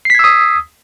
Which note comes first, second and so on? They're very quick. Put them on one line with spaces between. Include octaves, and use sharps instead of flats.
C7 B6 G#6 E6 D#6